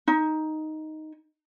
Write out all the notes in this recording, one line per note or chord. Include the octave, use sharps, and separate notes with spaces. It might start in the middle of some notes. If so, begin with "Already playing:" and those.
D#4